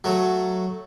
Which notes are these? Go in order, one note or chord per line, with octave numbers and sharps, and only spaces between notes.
F#3 A3